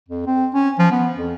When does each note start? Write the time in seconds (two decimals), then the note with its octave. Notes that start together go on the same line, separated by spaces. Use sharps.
0.09 F2
0.27 C4
0.54 C#4
0.79 F3
0.92 B3
1.17 F2